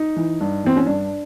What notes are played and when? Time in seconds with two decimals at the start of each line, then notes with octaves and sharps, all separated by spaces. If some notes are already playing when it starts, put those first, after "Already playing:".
Already playing: D#4
0.16 E3
0.41 G2
0.64 E3 C4
0.77 C#4
0.86 G2 D4